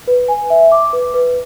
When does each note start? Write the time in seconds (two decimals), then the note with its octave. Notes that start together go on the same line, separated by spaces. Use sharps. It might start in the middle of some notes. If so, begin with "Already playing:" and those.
0.08 B4
0.28 G#5
0.50 E5
0.72 D6
0.93 B4
1.14 B4